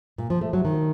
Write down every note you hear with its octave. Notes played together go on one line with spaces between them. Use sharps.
A#2
F3
A3
F#3
D#3